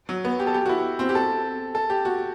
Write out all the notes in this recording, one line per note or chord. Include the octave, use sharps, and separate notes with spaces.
F#3
B3
G4
A4
G4
F#4
E4
C4
G4
A4
A4
G4
F#4